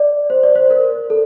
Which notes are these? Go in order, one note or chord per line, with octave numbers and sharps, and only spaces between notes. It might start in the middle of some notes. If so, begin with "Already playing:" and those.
Already playing: D5
C5
D5
C5
A#4
A4